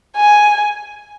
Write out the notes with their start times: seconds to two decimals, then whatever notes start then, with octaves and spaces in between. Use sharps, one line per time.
0.16 G#5